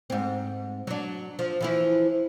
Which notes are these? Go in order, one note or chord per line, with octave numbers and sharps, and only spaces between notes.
G#2 C4
F#3 D4
F3
E3 F3 E4